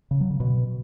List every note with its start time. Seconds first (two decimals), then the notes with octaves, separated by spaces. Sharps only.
0.11 C#3
0.21 F#3
0.30 C#3
0.40 B2